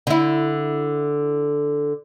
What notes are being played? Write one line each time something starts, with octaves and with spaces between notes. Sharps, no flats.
D3 E4